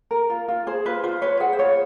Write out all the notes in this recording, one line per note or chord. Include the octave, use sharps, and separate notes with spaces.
A#4
F4
F4
G#4 C5
F4 B4
F4 C5
B4 C#5
G#4 F#5
C5
F4 C#5